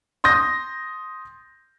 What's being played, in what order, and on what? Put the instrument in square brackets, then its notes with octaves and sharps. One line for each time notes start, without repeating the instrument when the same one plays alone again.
[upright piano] C6 D#6 G6 A#6